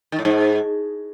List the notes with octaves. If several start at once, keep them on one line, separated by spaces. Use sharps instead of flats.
D#3
A2
G#2